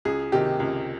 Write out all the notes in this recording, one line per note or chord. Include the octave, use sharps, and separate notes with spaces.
C#2 G#4
C3 D#3 G4
C#2